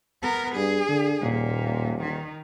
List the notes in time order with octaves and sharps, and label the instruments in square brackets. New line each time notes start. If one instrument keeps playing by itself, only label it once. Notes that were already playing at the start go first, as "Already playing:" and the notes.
[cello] B3 A#4
[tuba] G2 [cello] G#4
[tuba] D3
[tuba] D#1 [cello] A#2
[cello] D#3